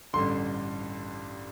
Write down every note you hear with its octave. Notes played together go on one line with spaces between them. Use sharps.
A1 G2 D3 C6